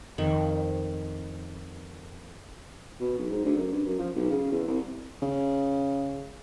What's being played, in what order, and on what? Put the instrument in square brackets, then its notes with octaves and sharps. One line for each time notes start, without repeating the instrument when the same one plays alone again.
[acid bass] F2 [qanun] D#3
[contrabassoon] B2
B1
G#2
D2
F#2
G2
F#2
F3
B1
C#3
E2
C2
C#3